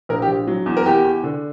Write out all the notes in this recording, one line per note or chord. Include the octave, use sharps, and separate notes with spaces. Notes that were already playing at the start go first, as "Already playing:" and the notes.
A#1 A#4
G4
A#1
F#3
E2
A#4
E2 G4
E2
D3